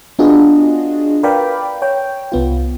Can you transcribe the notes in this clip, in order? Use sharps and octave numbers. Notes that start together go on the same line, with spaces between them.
B3 D4 F4 F#4 G#4 D#5
A#4 B4 D5 F5 G5 B5
C#5 G5
C2 B3 F4